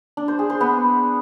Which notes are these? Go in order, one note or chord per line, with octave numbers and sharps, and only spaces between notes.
D4
C5
G#4
C5
B3